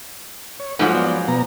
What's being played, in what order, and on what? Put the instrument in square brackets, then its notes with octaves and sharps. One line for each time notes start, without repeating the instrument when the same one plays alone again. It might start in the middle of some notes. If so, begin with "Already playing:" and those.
[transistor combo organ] C#5
[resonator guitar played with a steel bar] G#2 F3 F#3 [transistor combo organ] A3 F#5
[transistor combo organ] B3 D5
B2 B3 A#5